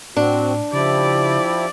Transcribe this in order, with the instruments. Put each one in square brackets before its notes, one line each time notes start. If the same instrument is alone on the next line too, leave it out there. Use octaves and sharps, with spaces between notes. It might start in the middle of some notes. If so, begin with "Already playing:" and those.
[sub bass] A2 [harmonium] C4 F#4 [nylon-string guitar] D4
[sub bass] C#3 [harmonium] F3 E4 G4 [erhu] D5